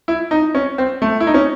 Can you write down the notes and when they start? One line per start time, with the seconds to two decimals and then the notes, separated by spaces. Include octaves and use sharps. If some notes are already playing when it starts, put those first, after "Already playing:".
0.08 E4
0.31 D#4
0.55 C#4
0.78 C4
1.02 A3
1.20 E4
1.27 D#4
1.34 C#4